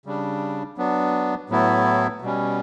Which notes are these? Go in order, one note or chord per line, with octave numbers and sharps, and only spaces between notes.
C#3 G3 D4
F#3 B3 D4
A2 F#3 B3 E4
B2 G3 C#4